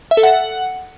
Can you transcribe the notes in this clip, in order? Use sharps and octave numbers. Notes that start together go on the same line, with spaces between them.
E5
A4
F#5